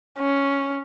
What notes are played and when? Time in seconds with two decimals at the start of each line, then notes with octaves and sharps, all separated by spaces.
0.19 C#4